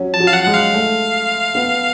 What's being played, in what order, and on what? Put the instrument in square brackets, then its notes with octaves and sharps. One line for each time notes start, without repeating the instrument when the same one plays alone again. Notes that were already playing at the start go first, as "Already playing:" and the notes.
Already playing: [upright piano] F#3 C#4
[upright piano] F3 [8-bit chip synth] A5
[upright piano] F#3
[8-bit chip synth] F5
F#5
[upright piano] G#3 [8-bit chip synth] F#5
[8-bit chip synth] F5
[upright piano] A3
B3